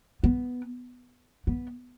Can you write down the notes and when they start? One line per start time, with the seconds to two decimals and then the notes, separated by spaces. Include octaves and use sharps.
0.23 B3
1.47 B3